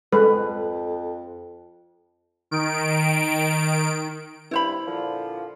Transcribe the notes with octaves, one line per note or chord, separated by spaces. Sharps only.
F2 G#3 A4 B4
D#3 D7
G2 E4 C5 B5
A#2 D3 F3